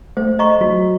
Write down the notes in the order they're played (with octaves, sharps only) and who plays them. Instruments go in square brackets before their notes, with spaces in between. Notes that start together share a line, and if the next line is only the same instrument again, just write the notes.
[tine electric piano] A3 [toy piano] C5
[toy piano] D#5 A#5 C#6
[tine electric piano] F#3 [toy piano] F#4